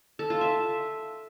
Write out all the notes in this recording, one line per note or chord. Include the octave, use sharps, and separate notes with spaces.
A4
F4
E5